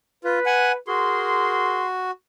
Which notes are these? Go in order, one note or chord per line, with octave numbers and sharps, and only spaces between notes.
F4 B4
F#5 G#5
F#4 G#4 A#4 C6